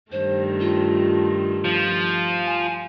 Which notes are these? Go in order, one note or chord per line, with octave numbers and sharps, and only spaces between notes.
G2 D#3 A3 C5
F4
F3
G#5